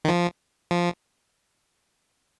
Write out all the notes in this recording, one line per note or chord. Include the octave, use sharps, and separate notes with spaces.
D#3
F3
F3